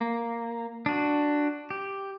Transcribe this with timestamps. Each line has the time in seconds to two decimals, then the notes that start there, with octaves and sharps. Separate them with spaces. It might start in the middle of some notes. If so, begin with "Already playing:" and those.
0.01 A#3
0.86 D4 F#4
1.71 G4